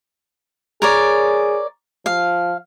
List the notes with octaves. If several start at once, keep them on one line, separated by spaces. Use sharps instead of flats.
G#4 A#4 C#5 D5
F3 F5